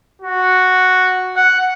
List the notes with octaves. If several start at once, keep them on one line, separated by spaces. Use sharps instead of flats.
F#4
F#5